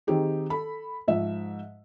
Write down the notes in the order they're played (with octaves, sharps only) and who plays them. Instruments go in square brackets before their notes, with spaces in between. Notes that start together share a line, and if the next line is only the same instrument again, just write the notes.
[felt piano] D#3 C4 D#4 G4 G#4
A4 B5
G#2 F3 E5